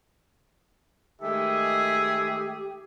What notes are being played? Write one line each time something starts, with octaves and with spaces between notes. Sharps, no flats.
D#3 G#3 A3 G4 G#4 E5